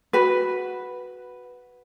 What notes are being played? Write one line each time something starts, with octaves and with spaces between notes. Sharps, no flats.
F#4 B4